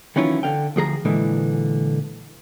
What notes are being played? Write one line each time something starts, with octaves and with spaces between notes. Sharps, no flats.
D#3 E3 F#3 C#4 E4 F4
D3 F5 G5
D2 F3 G#4 A#5
A#2 D3 E3 G#3 E4